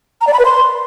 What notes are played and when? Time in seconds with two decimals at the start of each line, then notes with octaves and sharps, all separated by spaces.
0.21 A#5
0.27 D5
0.33 B5
0.39 B4
0.45 C6